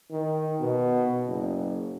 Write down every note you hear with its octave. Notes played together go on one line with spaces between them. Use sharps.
D#3
B2
F#1